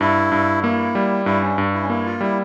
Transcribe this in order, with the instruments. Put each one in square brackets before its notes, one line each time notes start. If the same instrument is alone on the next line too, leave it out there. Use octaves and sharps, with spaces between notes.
[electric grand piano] G2 [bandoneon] E4
[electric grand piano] G2
[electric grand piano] A#3 [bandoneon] E4
[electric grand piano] G3
[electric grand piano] G2 [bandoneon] E4
[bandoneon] C#4
[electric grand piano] G2
[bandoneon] E4
C#4
[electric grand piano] A#3 [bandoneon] E4
[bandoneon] F4
[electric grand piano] G3 [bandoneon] E4